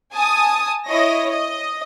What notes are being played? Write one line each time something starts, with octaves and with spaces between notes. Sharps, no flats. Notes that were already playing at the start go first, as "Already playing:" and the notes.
G#5 A5 D#6
E4 C#5 D#5 A#6
D#5